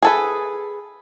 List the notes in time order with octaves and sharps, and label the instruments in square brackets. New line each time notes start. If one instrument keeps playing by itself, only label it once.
[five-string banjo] G#4 A4 B4